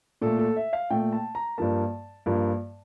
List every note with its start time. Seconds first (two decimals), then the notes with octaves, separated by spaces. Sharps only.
0.21 A#2 A3 A4
0.39 A4
0.57 E5
0.73 F5
0.90 A#2 A3 G5
1.13 A5
1.35 A#5
1.58 G2 F3 A#3 A5
2.26 G2 F3 A#3